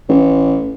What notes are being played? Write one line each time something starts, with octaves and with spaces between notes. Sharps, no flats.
A1